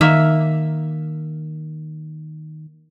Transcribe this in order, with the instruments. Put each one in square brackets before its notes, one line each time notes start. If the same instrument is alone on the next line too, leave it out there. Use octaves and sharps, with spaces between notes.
[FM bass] D#3 [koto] A#3 E5